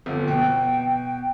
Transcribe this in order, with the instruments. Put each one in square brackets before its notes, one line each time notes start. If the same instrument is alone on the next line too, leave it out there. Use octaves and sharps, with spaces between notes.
[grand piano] G1 F2
[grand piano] B2 [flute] G5